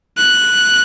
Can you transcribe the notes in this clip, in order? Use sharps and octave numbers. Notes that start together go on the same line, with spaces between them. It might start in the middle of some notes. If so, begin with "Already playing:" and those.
F#6